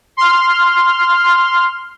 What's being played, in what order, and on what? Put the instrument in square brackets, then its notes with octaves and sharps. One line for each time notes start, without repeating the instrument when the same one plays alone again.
[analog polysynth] C6 F6